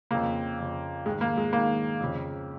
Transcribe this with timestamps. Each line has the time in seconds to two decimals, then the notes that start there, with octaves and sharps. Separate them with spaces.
0.11 F2 C#3 A#3
0.59 F2 C#3
1.06 G#2 D#3 G#3
1.21 A#3
1.37 G#3
1.53 G#2 D#3 A#3
2.00 F2 C#3